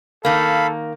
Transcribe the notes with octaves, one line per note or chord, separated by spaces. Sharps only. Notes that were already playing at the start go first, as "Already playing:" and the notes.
D#3 A#3 A4 F5 B5